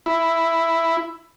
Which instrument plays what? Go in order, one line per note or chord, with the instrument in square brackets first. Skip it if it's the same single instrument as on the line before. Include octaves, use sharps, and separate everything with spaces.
[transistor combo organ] E4